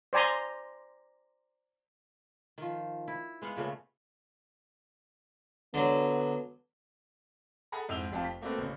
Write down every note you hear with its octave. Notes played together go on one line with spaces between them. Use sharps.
C5 D5 G#5 A#5 C6
D#3 F3
E4
G#3 B3 F5 F#5
A#2 C#3 A3 B3
D3 F#3 B3
G#4 A4 F#5 G#5 A#5 B5
F2 G#2 E4 E6 F7 G7
F1 F2 F4 A5
B6
A3 A#3 C4 F#4 A4 B4
A1 C#3